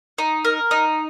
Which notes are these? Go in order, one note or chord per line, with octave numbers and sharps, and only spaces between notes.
D#4
A#4
D#4